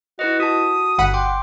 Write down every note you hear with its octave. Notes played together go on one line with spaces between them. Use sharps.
E4 F#4 B4 D#5
F#4 A5 D#6
G1 F#5 B5
G5 C6 D6